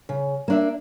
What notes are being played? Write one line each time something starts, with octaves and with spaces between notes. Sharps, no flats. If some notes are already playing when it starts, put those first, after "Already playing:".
C#3
A#3 D4 E5